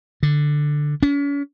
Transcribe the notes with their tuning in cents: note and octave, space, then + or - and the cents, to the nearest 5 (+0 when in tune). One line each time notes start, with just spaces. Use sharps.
D3 +5
C#4 +40